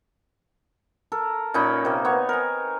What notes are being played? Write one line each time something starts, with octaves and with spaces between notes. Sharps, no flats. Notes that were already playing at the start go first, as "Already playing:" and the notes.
A4 A#4
A#2 C#4 D#4 B5
C3 A#3
B3 C#5
A#4 G#5